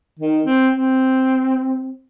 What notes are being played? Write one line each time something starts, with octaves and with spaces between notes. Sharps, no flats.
D#3
C4
C4